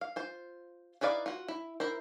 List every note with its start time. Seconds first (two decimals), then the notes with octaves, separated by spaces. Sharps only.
0.01 F5
0.16 F4 C5
1.01 D#4 E4 B4 D5 F5
1.26 F4 F#4
1.48 E4
1.80 E4 A#4 C5